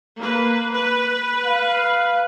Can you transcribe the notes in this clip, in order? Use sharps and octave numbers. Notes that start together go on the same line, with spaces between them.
A#3 B4
B4
F5